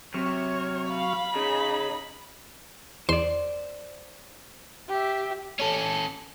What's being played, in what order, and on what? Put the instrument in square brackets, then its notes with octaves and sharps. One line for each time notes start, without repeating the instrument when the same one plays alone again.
[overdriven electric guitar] C3 [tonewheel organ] F#3 C#6 F6 [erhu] C#5
[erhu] F5 [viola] B5
[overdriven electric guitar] C#3 [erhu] D#4 [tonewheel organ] G#4
[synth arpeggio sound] E2 C6 [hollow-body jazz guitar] C5 D5
[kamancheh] G4 E5
[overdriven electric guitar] C#4 A4